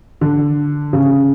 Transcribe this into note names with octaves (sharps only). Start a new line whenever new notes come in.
D3
C#3